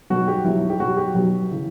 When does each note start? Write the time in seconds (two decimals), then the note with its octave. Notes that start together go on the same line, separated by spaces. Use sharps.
0.10 B1 B2 F#3 F#4
0.28 G4
0.45 B1 B2 F#3 E4
0.70 G4
0.80 B1 B2 F#3 F#4
0.97 G4
1.14 B1 B2 F#3
1.51 C#3 E3